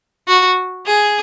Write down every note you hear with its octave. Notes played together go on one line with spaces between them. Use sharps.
F#4
G#4